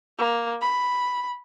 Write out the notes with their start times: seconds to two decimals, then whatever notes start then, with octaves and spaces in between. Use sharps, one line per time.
0.18 A#3
0.61 B5